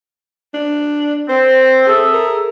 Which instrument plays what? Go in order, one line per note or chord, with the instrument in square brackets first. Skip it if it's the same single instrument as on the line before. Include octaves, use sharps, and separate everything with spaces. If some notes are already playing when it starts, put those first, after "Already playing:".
[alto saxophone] D4
[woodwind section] C4 [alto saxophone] C5
[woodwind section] G#4 A4 E5
[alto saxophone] A#4